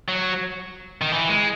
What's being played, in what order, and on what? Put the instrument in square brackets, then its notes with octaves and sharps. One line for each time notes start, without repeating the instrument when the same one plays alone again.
[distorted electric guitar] F#3
D#3
E3
G#3